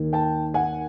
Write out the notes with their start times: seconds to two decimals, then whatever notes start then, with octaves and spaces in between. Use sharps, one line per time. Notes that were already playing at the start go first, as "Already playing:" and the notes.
Already playing: D#2 D#3
0.13 G5 A5
0.54 F#5 G#5